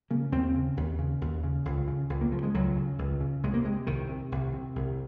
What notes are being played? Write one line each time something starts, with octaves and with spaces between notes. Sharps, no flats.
C#3 A#3
D#2 C4
C#3
D#2
C#3
D#2
C#3
C#2
C#3
C#2
A#3
C#3 F3
G#3
C#2 F#3
C#3
C#2
C#3
C2 G#3
A#3
C3 G#3
C2 D#3
C3
C2
C3
C2